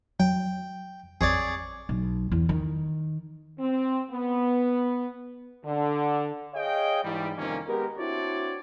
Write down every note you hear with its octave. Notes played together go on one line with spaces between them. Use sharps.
F#3 G5
A1 C4 G#4 C#5 D5
B1
E2
D#3
C4
B3
D3
G#4 C#5 D#5 F5 G5
G#2 E3 G3
F2 C3 D#3 G3 A#3 C#4
G#3 B3 G4 A#4
C4 D4 E4 F#4 C#5 D5